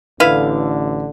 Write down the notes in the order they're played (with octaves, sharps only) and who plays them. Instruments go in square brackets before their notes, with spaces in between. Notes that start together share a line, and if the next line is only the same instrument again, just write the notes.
[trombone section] A1 D3 [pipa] E4 B4 F5